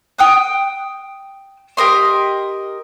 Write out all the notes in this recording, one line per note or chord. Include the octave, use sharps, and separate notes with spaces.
G5 D#6 F#6
G4 A#4 D#5 C6